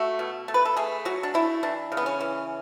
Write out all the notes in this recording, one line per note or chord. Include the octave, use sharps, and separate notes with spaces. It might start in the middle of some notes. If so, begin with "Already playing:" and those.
Already playing: A3 F#4
B2
A3
B4
A4
A3 G#4
F#3 F#4
D4
A3 E4
E3 D4
C#3
B3
C#4
E3